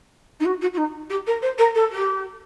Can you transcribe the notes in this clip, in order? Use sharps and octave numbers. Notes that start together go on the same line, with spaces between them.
D#4
F#4
F#4
F#4
D#4
G4
A#4
C5
A#4
A4
G4